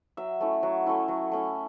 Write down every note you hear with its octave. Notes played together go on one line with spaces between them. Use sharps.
F#3 E5
A3 C#4 E4
F#3
A3 C#4 E4
F#3
A3 C#4 E4